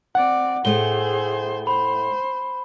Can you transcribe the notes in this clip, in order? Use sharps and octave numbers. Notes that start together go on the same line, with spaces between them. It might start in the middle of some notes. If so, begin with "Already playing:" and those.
C4 D5 F#5
A2 A3 G#4 C5 G7
C5 B5